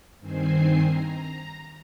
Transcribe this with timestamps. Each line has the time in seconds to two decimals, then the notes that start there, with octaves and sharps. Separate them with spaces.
0.20 G2 D#3 C4 C5 G#5 C7
0.85 A#5